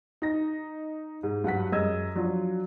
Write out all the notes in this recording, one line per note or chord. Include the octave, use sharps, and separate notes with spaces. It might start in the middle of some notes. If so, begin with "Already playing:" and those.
D#4 A#6
G#2
G2 F#3 F#5 B6
F#2 G#3 D#5 E6 G#6
F3 F#3 D4 F4